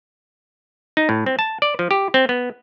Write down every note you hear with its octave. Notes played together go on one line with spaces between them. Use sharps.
D#4
A2
C4
A5
D5
F3
G4
C4
B3